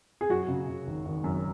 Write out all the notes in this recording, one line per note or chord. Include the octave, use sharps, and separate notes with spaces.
G#4
F#2 F#4
C#3
C#3
G#1
G#1
F#2